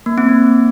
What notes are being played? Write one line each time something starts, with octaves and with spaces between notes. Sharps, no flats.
A#3
C4
A#3